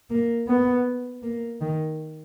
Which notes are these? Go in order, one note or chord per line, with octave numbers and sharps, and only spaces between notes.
A#3
B3
A#3
D#3